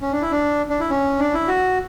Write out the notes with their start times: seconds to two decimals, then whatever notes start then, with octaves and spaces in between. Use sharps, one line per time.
0.02 C#4
0.12 D4
0.22 E4
0.32 D4
0.70 D4
0.80 E4
0.90 C#4
1.19 D4
1.34 E4
1.48 F#4